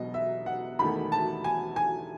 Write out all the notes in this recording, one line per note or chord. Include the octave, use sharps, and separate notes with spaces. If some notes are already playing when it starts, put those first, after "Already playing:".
Already playing: E1 B2 F#3 D#5
E5
F#5
E1 E2 D#3 A3 B5
A5
G#5
G#5